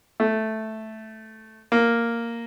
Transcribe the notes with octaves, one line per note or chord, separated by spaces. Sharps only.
A3
A#3